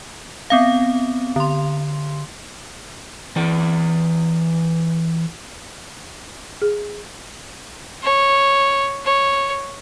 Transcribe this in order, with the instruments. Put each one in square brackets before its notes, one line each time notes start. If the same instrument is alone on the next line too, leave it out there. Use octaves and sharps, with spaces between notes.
[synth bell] B3 C4 F5
D3 C6
[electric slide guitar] E3 D5
[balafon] G#4
[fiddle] C#5
C#5